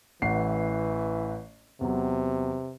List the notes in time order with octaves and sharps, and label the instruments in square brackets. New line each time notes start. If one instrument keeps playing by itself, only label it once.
[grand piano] A1 F#5 C7 [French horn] E3
[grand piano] E2 F#3 [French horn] C3